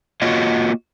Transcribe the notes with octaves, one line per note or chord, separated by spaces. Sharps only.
A#3 F4 F#4 C#5 D#5